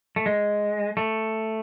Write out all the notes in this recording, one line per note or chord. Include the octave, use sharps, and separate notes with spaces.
A3
G#3
A3